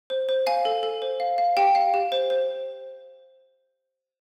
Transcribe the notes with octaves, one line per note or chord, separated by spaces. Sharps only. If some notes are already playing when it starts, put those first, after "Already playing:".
C5
C5
F5 G#5
A4
A4
C5
F5
F5
G4 G5
F5
G4
C5
C5